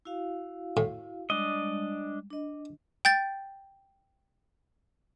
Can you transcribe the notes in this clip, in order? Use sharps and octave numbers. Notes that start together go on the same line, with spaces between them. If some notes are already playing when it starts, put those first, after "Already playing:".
E4 F#4 F5
A2
G3 G#3 D4 D#5
D4 D#5
G5 G6 A6